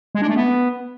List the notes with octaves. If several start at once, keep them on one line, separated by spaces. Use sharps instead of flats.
G#3
D4
A3
B3